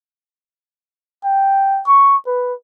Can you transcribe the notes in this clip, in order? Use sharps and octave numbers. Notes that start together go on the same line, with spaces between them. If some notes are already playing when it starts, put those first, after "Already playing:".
G5
C#6
B4